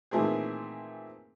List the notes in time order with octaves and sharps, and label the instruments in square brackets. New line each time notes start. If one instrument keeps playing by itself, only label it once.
[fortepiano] A#2 D#3 E3 A3 C4 G#4